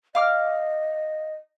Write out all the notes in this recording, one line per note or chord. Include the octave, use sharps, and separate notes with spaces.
D#5 F5 D6 F6